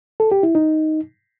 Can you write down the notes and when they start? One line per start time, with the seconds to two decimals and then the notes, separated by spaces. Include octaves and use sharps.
0.20 A4
0.32 G4
0.43 E4
0.55 D#4